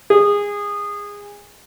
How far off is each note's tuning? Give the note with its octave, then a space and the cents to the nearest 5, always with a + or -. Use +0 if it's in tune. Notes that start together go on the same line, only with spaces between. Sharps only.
G#4 -20